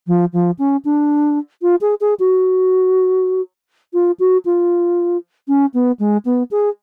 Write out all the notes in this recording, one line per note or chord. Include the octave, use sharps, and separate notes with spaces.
F3
F3
C#4
D4
F4
G#4
G#4
F#4
F4
F#4
F4
C#4
B3
G#3
B3
G#4